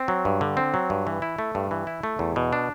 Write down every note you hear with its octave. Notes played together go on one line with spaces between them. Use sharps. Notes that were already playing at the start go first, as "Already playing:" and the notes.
Already playing: C4
F#3
G2
D3
C4
F#3
G2
E3
E4
A3
G2
E3
E4
A3
E2
B2
D4